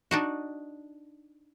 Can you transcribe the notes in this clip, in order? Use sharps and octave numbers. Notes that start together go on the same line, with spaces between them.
D4 D#4 F#4